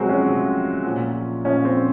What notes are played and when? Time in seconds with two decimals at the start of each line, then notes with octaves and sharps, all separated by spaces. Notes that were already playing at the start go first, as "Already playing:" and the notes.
Already playing: C3 F3 F#3 G#3 C4 F#4 G#4
0.09 C#4
0.24 C3 F3
0.84 A#2 F3
1.45 A#2 F3 C#4
1.65 C4